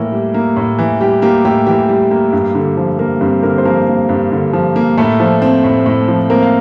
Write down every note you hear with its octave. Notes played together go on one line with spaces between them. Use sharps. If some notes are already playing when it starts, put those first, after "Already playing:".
Already playing: A2 E3 A#3 A#4
G3
A#3
A2
E3
G3 G4
A#3 G4
A2 G4
E3 G4
G3
A#3
G2
D3
F3
A#3 A#4
G2 C4 C5
D3 A#3 A#4
C5
F3 A#3 A#4
A#3
G2
D3
F3
A#3
A2 A3 A4
F3
C4
A2
A2
F3
A#3 C4 A#4
F5